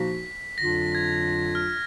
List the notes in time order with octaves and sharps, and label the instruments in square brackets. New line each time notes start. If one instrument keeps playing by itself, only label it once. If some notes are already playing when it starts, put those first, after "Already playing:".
Already playing: [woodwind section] A#2 F3 A#3 D#4 F#4 [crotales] B6
[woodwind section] F2 D3 F#3 D4 F4 [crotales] A#6
[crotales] G#6
F6